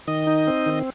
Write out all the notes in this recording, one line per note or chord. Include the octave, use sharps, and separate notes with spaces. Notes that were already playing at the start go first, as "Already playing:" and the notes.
D#3 D#5
D#4
C4
D#3